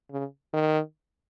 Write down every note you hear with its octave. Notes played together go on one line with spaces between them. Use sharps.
C#3
D#3